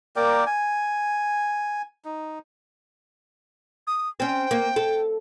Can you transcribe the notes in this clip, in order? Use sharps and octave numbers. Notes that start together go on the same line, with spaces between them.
A#3 A#4 D5 G5
G#5
D#4
D#6
C4 C#4 G5
A#3
A4